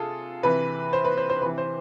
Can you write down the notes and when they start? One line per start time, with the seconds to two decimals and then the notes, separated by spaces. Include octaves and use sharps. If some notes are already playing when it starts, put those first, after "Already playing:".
Already playing: C3 F4 G#4 A4
0.43 C3 E3 B4
0.93 C5
1.05 B4
1.18 C5
1.30 C5
1.41 C3 B4
1.45 E3
1.58 C5